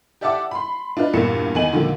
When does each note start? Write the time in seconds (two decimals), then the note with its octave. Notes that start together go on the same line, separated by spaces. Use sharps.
0.21 G4 D5 E5 F#5 A5 D6
0.51 B5 C6
0.97 D4 D#4 F4 B4
1.13 E2 G2 A#2 A#3 C#7 E7
1.55 E2 D#3 D#4 G#5 D#7 F#7
1.72 A#2 D3 D#3 F3 F#3 A#3